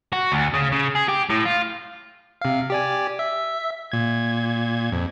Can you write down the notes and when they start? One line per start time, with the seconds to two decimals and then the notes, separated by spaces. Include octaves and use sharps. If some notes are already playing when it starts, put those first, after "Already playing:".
0.13 F#4
0.32 D2
0.54 C#3
0.72 C#3
0.95 G#4
1.08 G4
1.29 A2
1.45 F4
2.41 C3 F5
2.70 G4 D5 G#5
3.19 E5
3.92 A#2 G#6
4.92 F2